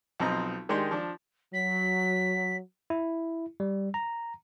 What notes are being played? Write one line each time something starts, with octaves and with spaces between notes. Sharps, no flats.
B1 F3 C4 D#5 A#5
D#3 G#3 D4 D#4 G4 C6
F3 D4
F#3 B6
E4
G3
A#5